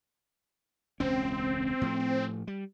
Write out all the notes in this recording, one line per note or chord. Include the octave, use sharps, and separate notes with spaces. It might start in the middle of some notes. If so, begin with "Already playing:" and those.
E1 C#2 C4 C#4
A2 F3 A3
G3